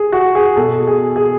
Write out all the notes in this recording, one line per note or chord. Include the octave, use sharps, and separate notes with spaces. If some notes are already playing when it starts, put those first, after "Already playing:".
Already playing: G#4
F#4
G#4
B2 A4
G#4
G#4